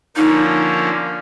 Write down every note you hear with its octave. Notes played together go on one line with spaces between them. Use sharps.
D3 F3 A#3 C#4 D#4